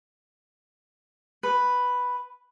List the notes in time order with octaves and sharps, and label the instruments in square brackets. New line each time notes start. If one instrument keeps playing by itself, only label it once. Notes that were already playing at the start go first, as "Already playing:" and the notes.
[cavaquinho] B4